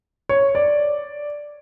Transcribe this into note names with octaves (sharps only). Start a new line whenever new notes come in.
C#5
D5